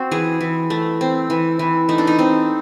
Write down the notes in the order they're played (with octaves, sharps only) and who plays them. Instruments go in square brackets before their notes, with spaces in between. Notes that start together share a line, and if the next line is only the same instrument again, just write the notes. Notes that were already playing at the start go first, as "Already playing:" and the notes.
Already playing: [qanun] C4 F#4
E3 G#4
E3
A3
C4
E3
E3
A3 D#4
D4
D#4
C4